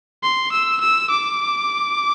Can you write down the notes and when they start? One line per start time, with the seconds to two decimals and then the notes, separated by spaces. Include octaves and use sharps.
0.23 C6
0.52 E6
0.81 E6
1.10 D6